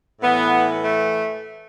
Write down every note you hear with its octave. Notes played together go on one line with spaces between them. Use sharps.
A2 E3 B3
A3